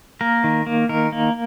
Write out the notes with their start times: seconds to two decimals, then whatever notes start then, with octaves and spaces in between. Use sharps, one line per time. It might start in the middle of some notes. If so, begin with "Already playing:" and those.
0.21 A#3 A#4
0.44 D#3
0.66 A#3
0.89 D#3 A#4
1.12 A#3